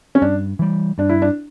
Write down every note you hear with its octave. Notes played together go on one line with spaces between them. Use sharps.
C#4
G2 D4
E3 G3
G2 D4
E4
D4